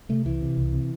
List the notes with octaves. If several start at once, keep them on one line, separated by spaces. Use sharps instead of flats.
C3 A3
C2 E3
C3
C2
C3